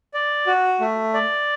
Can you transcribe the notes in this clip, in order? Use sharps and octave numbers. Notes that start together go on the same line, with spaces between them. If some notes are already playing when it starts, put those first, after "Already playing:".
D5
F#4
A3
D5